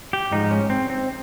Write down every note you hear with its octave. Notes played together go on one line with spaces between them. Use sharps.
G4
G#2 F3 G#3 D#4
C#4
C4
C4